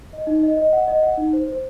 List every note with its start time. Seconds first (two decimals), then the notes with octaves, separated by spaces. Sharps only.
0.13 D#5
0.27 D#4
0.43 D#5
0.57 D#5
0.73 F#5
0.88 D#5
1.03 F#5
1.18 D#4
1.33 C5
1.48 C5